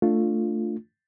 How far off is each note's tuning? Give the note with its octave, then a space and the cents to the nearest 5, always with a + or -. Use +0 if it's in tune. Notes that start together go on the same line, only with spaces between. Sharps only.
A3 +15 D4 +0 F4 +0